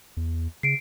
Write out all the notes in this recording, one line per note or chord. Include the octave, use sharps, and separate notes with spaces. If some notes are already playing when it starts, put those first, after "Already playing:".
E2
C#3 C7 D7